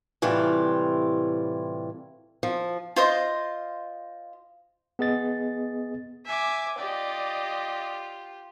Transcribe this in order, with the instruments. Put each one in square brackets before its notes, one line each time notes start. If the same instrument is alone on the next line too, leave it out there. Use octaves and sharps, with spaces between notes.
[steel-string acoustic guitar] A2 C3 E3 G3 F4
F3
[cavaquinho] F4 C5 D#5
[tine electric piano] B3 G#4 D#5 A6
[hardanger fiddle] E5 [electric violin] G#5 D6
[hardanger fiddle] F4 G4 [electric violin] D5 D#5